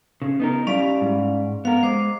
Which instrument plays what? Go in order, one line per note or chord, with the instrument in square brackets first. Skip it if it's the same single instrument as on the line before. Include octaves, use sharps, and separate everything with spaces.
[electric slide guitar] C#3
B3 D#4 A#4
[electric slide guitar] G3 E4 [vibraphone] C#4 D5 F5
[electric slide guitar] G#2
[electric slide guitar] B3 A#4 [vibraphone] F5
[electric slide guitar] G#3 [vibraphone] C5 D6